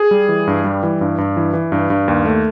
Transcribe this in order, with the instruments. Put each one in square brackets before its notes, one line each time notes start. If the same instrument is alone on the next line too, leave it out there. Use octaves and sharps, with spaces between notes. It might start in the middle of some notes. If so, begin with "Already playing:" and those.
Already playing: [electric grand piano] G#4
G3
E3
G2
G3
E3
G2
G2
E3
E3
G2
G2
D#2
A3